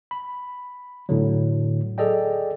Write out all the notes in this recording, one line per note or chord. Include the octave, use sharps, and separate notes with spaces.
B5
A2 D3 F#3
G#4 A4 D5 D#5 G5